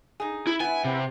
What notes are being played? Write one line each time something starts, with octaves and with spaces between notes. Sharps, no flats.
D#4 G#4
E4
B3 E4 G#5
C3